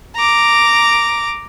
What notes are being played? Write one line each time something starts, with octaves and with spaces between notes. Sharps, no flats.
A#5 D6